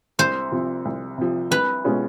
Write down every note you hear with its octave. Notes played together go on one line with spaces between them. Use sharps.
C2 C5
C3 F3
C2
C3 F3
C2 B4
B2 G#3 C#4 F4